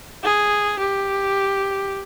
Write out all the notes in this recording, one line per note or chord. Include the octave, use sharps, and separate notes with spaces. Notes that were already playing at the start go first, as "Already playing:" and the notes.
G#4
G4